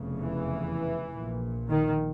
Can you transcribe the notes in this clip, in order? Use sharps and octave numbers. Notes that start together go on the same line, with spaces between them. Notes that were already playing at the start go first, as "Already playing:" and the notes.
Already playing: F1 E2 C#3
E3
A#1 A#2
D#3